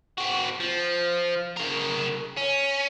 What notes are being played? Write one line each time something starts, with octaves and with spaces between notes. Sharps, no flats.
C4 F#4
F3
C#3 A#4
C#4